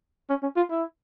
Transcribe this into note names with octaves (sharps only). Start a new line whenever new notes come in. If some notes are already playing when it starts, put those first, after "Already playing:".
C#4
C#4
F4
E4